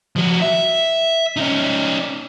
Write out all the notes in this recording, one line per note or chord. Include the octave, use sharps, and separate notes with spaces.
F3 F#4
E5
C#4 D#4